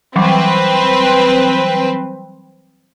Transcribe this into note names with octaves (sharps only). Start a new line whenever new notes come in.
E3 F#3 G3 C4 B4